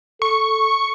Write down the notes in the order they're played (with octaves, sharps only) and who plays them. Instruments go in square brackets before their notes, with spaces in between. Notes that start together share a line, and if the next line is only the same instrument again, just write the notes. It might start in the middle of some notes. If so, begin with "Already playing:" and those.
[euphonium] A4 [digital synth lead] C#6